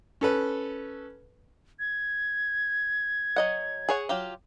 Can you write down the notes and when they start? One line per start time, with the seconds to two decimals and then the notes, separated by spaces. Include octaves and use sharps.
0.21 C#4 A4 B4
1.80 G#6
3.36 F#3 D#5 F#5
3.89 G#4 C#5 F#5
4.09 F#3 F4 G4